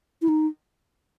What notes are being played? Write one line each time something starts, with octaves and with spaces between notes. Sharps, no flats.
E4
D#4